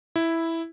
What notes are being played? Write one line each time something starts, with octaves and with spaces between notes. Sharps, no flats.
E4